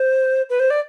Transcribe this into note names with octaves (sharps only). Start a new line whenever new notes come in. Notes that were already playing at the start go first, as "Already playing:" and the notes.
Already playing: C5
B4
C5
D5